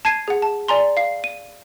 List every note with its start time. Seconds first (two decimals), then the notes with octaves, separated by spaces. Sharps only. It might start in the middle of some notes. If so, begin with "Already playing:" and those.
0.05 A5 G#6 C7 D#7
0.28 G#4 F#5
0.42 A5
0.68 D5 G#5 A#5 C6
0.97 F5 C7
1.24 D#7